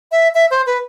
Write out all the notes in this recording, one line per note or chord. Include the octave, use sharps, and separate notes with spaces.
E5
E5
C5
B4